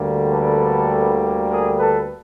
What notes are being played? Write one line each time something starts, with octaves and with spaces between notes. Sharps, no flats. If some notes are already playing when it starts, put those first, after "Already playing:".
Already playing: D2 D3 G3 A#3
A4 B4
G#4 A#4
A4 B4